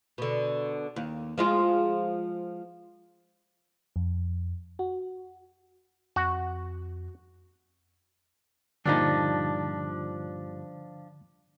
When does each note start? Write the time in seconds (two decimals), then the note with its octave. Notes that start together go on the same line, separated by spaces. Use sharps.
0.18 B2 D3
0.96 D#2
1.38 F3 G#3 F4
3.96 F2
4.79 F#4
6.16 F2 F#4
8.86 G2 A#2 D3 F3 D4 D#4